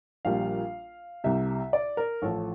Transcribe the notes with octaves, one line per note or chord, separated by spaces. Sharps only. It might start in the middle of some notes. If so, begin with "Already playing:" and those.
A#1 A#2 G3 F5
C2 C3 G3 E5
D5
A#4
A1 A2 F3 A4